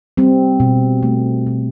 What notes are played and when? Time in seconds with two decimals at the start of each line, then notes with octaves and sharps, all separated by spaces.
0.17 G3 C4
0.60 B2
1.03 A3
1.47 B2